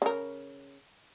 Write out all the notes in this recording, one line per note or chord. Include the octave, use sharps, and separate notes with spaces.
C#3 A#4